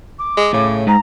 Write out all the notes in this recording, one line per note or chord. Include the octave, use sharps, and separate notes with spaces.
D6
G#3
A2 C#3
G#2 A#5